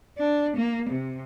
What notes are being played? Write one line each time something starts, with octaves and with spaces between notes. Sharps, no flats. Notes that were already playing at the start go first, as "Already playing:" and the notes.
D4
A#3
C3